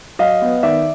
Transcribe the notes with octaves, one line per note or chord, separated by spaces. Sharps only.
F#3 D#5 F5
B3
D#3 D5 E5